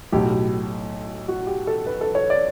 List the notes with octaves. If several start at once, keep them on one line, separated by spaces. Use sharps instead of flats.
B1 A2 F#3 G4
F#4
G4
A4
B4
A4
C#5
D5